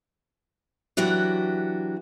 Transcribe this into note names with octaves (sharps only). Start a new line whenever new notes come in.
E3 F#3 D4 F#4 G4